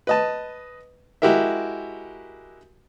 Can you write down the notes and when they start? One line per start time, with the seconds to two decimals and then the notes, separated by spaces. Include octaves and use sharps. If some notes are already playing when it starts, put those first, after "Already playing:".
0.07 B4 D#5 A5
1.22 G#3 E4 F#4 G4 A#4 E5